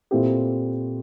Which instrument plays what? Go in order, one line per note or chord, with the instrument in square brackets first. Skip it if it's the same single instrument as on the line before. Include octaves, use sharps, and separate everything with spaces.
[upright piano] A#2 A3 C4 E4 G4